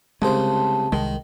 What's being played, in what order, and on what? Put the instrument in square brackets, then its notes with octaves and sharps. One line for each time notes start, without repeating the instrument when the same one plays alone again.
[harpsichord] C2 C#3 C5 [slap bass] G#3 [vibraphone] A5
[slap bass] C2 G#3 [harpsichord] D#3